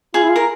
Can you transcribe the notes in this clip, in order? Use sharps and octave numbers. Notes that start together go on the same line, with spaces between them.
F4 G#4
E4
F4
A#4